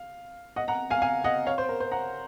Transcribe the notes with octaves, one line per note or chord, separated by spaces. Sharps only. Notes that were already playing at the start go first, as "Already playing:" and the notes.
Already playing: F5
D#5 F#5
F#5 A#5
F5 G#5
F5 G#5
D#5 F#5
C#5 F5
C5
A#4
C5
F#5 A#5